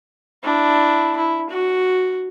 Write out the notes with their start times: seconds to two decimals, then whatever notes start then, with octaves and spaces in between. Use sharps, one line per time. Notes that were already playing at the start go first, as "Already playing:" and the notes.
0.44 D4 E4
1.17 E4
1.50 F#4